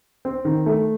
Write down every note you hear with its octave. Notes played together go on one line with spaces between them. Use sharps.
C4
D#3
A3